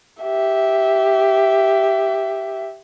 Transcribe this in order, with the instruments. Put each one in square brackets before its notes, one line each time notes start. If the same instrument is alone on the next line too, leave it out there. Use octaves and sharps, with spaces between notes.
[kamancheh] G4 E5